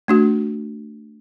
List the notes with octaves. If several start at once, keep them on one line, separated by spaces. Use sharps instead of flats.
A3 D4 F#4